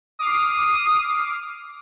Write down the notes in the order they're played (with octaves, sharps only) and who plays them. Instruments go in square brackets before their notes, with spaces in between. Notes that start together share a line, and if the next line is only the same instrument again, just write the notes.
[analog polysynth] D6 F6 C7 [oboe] D#6